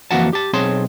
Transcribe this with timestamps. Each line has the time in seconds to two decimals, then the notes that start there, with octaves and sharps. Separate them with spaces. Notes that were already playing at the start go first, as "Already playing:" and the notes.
0.11 F2 E3 A#3 F#4 F#5 A5
0.33 G4 A5
0.53 B1 C4 G#4 C#5 A5 C6